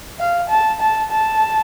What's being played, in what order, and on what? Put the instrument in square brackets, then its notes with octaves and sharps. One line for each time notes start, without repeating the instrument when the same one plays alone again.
[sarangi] F5
A5
A5
A5